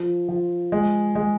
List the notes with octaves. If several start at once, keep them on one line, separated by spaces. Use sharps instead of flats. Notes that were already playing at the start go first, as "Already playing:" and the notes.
Already playing: F3
F3
G#3
G#3